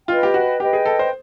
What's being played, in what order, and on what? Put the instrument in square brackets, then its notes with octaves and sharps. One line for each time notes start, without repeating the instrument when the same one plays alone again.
[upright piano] F4 [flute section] B4 D#5 G5
[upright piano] G4
F#4
[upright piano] G4 [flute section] B4 D#5 G5
[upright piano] G#4
A4
C5